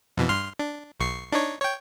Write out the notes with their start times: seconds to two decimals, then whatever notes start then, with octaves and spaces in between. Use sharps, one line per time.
0.17 F2 B2 E3
0.29 G2 C6 F6
0.59 D4
1.00 B1 C#6 C7
1.32 D4 D#4 C#5
1.62 C#5 G5